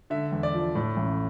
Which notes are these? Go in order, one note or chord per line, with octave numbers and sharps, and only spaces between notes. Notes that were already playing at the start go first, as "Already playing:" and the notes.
D3 E5
E2
D5
F3
A2
A1